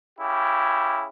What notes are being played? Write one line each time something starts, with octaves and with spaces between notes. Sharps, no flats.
C#3 E4 G4